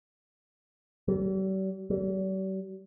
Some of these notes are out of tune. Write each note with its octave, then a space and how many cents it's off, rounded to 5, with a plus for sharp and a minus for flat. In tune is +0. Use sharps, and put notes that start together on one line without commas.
G3 -45
G3 -45